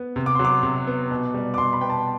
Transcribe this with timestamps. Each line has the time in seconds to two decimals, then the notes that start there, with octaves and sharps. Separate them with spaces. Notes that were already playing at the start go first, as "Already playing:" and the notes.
Already playing: B3
0.16 C3
0.26 D6
0.35 F#3 C6
0.45 D6
0.63 C3
0.87 B3
1.11 B2
1.34 G3
1.54 D6
1.58 B2 C6
1.73 B5
1.81 B3 G5
1.90 A5